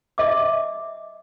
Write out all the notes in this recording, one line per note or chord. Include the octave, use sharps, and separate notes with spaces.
D#5 E5 D6